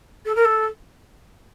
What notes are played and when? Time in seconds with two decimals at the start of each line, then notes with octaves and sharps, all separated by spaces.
0.25 A4
0.35 A#4
0.44 A4